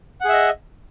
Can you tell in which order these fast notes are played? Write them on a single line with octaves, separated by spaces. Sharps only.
F#5 G#4 E5 D#5